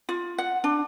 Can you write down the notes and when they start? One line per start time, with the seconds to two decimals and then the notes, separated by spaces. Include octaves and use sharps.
0.09 F4
0.38 F#5
0.64 D4